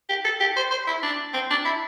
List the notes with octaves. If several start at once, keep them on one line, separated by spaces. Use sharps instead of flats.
G4
A4
G4
C5
C5
E4
D4
C4
D4
E4